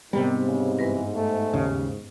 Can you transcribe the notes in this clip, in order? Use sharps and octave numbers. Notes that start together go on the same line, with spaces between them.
G#2 C3 D#3 G3 B3
C#3
G2 E3 B4 A#6
A3
D#2 C#3